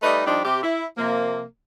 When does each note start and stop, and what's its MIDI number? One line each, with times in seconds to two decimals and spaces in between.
0.02 0.22 55
0.02 0.22 57
0.02 0.22 63
0.02 0.22 71
0.02 0.22 75
0.26 0.40 53
0.26 0.40 55
0.26 0.40 62
0.26 0.40 63
0.26 0.40 67
0.44 0.60 48
0.44 0.60 67
0.62 0.85 64
0.97 1.43 48
0.97 1.43 53
0.97 1.43 58